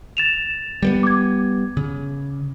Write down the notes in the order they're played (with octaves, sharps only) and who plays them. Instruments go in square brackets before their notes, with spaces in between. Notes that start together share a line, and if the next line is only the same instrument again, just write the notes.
[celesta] A6 E7 F7
[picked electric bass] G3 A#3 B3
[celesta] D6 G#6
[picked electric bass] C#3